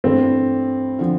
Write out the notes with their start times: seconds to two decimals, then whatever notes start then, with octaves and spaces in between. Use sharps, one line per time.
0.04 G2 E3 A3 C4
0.99 D3 F3